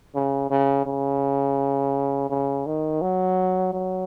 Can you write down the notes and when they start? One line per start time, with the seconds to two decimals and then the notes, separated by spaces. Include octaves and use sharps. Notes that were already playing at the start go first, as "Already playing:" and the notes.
0.15 C#3
0.51 C#3
0.86 C#3
2.30 C#3
2.66 D#3
3.02 F#3
3.74 F#3